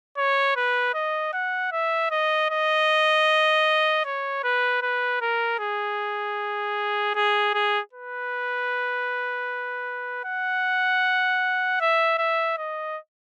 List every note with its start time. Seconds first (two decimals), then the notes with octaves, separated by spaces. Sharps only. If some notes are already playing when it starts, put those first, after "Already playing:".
0.18 C#5
0.56 B4
0.94 D#5
1.33 F#5
1.72 E5
2.11 D#5
2.50 D#5
4.05 C#5
4.44 B4
4.82 B4
5.21 A#4
5.59 G#4
7.15 G#4
7.54 G#4
7.93 B4
10.24 F#5
11.81 E5
12.18 E5
12.58 D#5